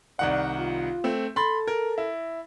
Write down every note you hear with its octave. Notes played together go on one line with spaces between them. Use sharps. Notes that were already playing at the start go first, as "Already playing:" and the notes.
C2 D#3 D5 F#5
F4
A3 C4
A4 B5 C6 A6
A#4
E4